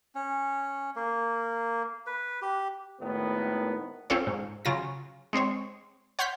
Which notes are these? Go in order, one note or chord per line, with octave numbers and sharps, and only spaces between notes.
C#4
A#3
B4
G4
G#1 A2 D#3 B3
C4 C#4 F4 A4 C#5
G#2
C#3 F#3 F4 A#6
G#3 C4 C5 C#5
C#5 F#5 C6 F6 G6 B6